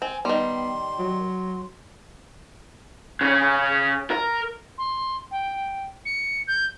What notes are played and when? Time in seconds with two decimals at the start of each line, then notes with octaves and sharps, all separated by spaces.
0.02 C4 G#5
0.25 D#3 G3 B3 C6
0.99 F#3
3.21 C#3 C#4
4.11 A#4
4.78 C6
5.31 G5
6.05 C#7
6.47 G6